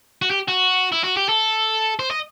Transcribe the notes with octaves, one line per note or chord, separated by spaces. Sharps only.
F#4
G4
F#4
E4
F#4
G4
A4
C5
D#5